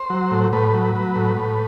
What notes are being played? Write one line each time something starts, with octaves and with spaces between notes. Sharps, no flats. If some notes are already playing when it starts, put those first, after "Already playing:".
Already playing: C5
F#3
A2
A2 B4
F#3
F#3
A2
A2